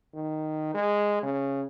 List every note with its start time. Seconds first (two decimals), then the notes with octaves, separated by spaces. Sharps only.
0.14 D#3
0.74 G#3
1.23 C#3